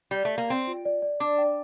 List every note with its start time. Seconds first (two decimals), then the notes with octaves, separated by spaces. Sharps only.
0.11 G3
0.25 A3
0.38 A#3
0.49 C4 D5
0.67 F4
0.85 D5
1.02 D5
1.20 D4 D6
1.38 G5